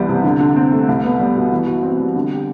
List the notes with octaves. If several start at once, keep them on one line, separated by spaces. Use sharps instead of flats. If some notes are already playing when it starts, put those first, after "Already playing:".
Already playing: C2 E3 G3 B3
C3
D3
D3
C4
A3
C2
B3
G3
B2
E3
F#4
C4
G3
D3
G4